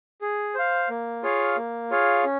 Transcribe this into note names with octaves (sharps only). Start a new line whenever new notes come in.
G#4
C5 F5
A#3
F4 G#4 C#5 F5
A#3
F4 G#4 C#5 F5
C#4